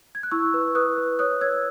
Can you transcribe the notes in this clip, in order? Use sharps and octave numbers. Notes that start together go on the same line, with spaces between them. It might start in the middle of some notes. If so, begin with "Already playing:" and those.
G#6
F#6
E4 C#6 E6
B4
B4 D#6 F#6
B4
C#5 D#6 F#6
C#5 E6 G#6